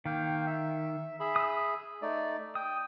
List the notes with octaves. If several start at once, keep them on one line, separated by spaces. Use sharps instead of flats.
D#3 A#3 F5 G5
E5
G#4 E5 B5
D#6 E6
A3 D#4 D5
G5 D#6